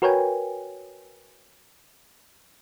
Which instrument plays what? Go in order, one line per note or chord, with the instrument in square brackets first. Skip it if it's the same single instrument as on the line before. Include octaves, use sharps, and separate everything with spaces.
[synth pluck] F#4 A#4 B4 C#5 G5 G#5